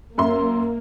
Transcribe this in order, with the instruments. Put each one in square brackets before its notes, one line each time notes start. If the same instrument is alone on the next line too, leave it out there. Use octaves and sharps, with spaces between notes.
[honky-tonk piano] F#2 E5 C6 [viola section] A#3